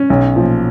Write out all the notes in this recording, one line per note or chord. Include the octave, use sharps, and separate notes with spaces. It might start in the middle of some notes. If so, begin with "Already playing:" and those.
Already playing: C#4
B1
A#2 F3